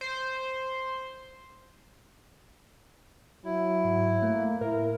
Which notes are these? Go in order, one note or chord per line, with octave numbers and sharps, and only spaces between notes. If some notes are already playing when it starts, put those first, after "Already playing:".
C5
F#3 E4
G#2
A3 A#3
A2 E4 A#4